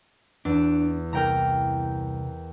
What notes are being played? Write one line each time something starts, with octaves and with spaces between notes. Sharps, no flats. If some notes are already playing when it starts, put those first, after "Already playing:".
E2 D4
C2 A#4 G5 A#5